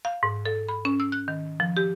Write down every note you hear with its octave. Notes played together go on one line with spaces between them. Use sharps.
F5
G#2
A4
B5
C#4
E6
F#6
D#3
F3
G4